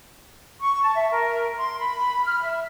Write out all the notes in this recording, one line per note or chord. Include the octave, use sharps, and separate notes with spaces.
C#6
A5
E5
A#4
C6
B5
F6
E5